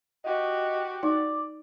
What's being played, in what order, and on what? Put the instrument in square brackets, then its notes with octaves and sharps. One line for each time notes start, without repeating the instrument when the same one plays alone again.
[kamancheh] F#4 G4 [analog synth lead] D#5
[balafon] D#4 [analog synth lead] D5